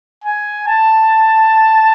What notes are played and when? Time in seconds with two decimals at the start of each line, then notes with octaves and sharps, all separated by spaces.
0.24 G#5
0.68 A5